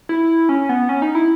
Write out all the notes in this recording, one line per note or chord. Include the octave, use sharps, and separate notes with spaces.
E4
C#4
B3
C#4
D#4
E4